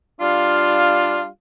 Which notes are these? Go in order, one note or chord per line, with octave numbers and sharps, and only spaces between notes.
G3 D4 F4 F5